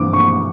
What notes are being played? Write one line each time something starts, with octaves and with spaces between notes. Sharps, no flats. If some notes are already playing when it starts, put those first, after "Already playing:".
Already playing: G2 E3 C4 D6
C#6